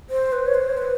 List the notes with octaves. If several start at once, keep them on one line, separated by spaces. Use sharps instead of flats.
C5
B4
C#5
C5
B4